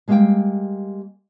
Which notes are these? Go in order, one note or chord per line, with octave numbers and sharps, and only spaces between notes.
G3 G#3 A#3 B4 F5 G5